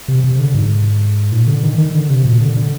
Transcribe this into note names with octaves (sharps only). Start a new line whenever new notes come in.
C3
C3
D3
G#2
A#2
D3
D#3
D#3
D3
C3
A#2
D3
D3